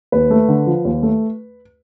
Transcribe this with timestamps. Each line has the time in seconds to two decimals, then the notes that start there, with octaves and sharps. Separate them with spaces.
0.12 D#2 B4
0.30 A3
0.48 D3
0.67 F3
0.85 D#2
1.03 A3